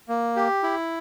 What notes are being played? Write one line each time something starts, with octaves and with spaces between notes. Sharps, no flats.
A#3
G4
E4